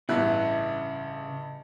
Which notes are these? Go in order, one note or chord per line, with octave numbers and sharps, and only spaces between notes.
A1 G2 C#3 E4 F#6